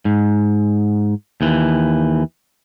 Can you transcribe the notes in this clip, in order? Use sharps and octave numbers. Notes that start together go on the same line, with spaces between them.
G#2
D#2 E3